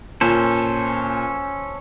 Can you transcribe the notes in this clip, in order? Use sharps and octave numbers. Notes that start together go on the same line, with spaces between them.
A#2 C#4 A4 C5